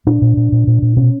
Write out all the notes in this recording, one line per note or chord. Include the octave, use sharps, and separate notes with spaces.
A#2 D4
A#2
A#2
A#2
A#2
A#2
B2 C#4